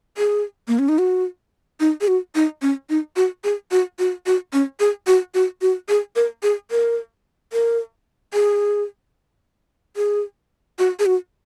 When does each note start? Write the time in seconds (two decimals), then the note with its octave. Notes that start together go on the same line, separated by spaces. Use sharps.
0.18 G#4
0.68 A#3
0.79 C#4
0.89 D#4
0.98 F#4
1.80 D#4
2.01 G#4
2.08 F#4
2.35 D#4
2.62 C#4
2.90 D#4
3.16 F#4
3.44 G#4
3.71 F#4
3.99 F#4
4.26 F#4
4.53 C#4
4.80 G#4
5.07 F#4
5.34 F#4
5.62 F#4
5.89 G#4
6.16 A#4
6.43 G#4
6.71 A#4
7.53 A#4
8.34 G#4
9.97 G#4
10.79 F#4
10.99 G#4
11.06 F#4